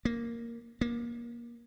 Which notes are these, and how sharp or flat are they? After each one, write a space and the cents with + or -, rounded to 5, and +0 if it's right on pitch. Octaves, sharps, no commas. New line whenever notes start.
A#3 +0
A#3 +25